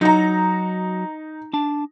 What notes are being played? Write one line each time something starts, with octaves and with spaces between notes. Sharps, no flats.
F#3 D#4 F#4 A#5
D4 A5